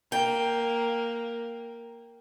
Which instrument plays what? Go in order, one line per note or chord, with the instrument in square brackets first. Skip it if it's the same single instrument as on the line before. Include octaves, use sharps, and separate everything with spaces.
[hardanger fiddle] A#3 [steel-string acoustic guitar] G5